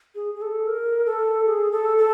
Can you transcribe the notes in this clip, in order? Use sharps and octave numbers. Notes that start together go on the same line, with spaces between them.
G#4
G#4
A4
A#4
A4
G#4
A4
A4